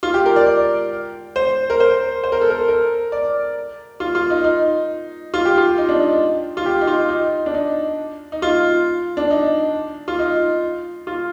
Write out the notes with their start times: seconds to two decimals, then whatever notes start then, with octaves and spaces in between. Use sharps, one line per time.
0.03 F4
0.14 G4
0.26 A#4
0.36 D5
0.47 D5
1.36 C5
1.70 A#4
1.80 C5
2.24 C5
2.32 A#4
2.41 A4
2.50 A#4
2.68 A#4
3.12 D5
4.00 F4
4.15 F4
4.30 D#4
4.44 D#4
5.34 F4
5.45 G4
5.58 F4
5.78 D#4
5.89 D4
6.00 D#4
6.57 F4
6.66 G4
6.81 D#4
6.87 F4
7.09 D#4
7.46 D4
7.54 D#4
8.32 D#4
8.42 F4
9.17 D4
9.31 D#4
10.08 F4
10.19 D#4
11.07 F4